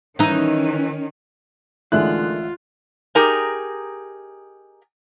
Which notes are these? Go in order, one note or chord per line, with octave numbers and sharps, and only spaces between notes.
D#3 E3 C#4 D#4
A1 D3 D#3 G#3 F4 E5 F#6
D#4 G4 G#4 A#4 A#5